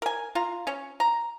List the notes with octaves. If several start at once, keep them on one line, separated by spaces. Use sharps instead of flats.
A#4 G#5
F4 F5 A#5
C#4 C#5
A#5